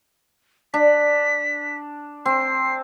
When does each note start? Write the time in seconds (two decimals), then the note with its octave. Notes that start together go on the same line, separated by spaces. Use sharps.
0.74 D4 B6
2.26 C4 C7